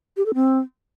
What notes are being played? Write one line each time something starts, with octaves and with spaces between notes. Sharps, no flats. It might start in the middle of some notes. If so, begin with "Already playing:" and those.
G4
A4
C4